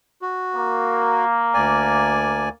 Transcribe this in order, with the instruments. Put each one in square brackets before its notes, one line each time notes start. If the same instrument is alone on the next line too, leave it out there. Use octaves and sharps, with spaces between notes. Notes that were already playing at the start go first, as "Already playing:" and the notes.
[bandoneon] F#4
[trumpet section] A#3
[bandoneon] D2 D5 G#5